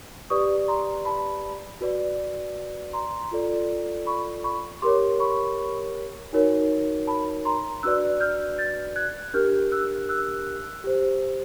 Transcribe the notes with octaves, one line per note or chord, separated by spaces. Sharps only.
G4 B4 D5 C#6 D#6
A#5 C6
A5 B5
F#4 B4 D5
A#5 C6
F4 A4 D5
B5 C#6
B5 C#6
G4 A#4 C#5 C6 D6
B5 C#6
D#4 F#4 A#4 C#5
A5 B5
A#5 C6
D4 F#4 B4 D5 E6 F#6
F6 G6
G6 A6
F#6 G#6
D4 G4 A#4 F6 G6
E6 F#6
E6 F#6
G4 C5